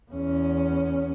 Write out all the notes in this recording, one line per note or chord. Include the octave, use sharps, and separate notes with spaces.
E2 C#4